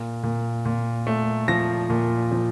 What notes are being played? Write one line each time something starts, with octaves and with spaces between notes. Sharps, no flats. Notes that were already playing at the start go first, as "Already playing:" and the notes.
Already playing: A#2
A#2
A#2
A3
F3 A#6
A#2
F3